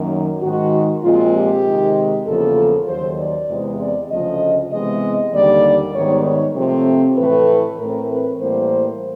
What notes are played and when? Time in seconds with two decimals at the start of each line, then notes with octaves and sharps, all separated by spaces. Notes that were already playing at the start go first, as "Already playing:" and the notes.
Already playing: F#2 D#3 F#3 A#3
0.41 G#2 D#3 G#3 F#4
1.03 A#2 F3 G#3 C4 F4
1.33 G4
1.64 C3 D#3 G#3
2.26 E2 C#3 F3 A#3 A4
2.87 D#2 D#3 F#3 C5
3.18 D5
3.49 E2 C3 E3 G#3 C4
3.79 D5
4.10 D2 C#3 F3 A3 D#5
4.71 C3 E3 G#3 B3 D#5
5.33 D#2 D3 G3 A#3 D5
5.94 G#2 D#3 G3 B3 C#5
6.25 C#5
6.56 C3 F3 A3 C4
7.17 A2 E3 A3 B4
7.79 A2 E3 A3 C4 A#4
8.10 B4
8.40 A2 E3 G3 A#3 C5